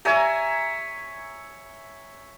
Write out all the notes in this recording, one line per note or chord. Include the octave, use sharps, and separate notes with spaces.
C#5 E5 G#5 A#5